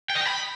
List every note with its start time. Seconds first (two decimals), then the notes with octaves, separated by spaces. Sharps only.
0.10 G5
0.15 D#5
0.21 G5
0.27 B5